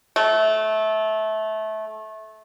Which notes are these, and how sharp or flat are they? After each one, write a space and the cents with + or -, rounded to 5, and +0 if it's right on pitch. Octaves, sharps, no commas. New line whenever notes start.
A3 -20